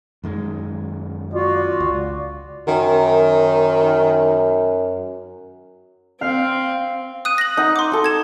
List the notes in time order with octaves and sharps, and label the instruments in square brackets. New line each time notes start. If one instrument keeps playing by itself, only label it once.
[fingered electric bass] F#2 D#3 G#3
[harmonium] F4 F#4 [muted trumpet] D5
[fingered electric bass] C#2
[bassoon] F#2 [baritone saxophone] D#3
[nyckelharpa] C4 [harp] F5
[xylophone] D#6 F#6 D#7
A#6 F#7
[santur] D#4 F#5
[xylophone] C6 D6
[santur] D#4 A4
[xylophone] G#6 E7